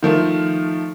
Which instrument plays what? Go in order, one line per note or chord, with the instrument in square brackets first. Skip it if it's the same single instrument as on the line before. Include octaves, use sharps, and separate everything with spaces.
[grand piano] D#3 F3 A3